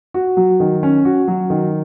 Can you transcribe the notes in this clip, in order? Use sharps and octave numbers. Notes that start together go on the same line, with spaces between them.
F#4
F#3
D#3
C#4
F#4
F#3
D#3